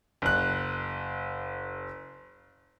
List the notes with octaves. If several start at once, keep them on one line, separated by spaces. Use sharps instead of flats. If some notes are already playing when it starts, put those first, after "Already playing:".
F#1 F#6